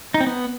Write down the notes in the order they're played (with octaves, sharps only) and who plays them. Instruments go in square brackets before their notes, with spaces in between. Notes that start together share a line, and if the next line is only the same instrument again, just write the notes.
[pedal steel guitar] D#4
C4
B3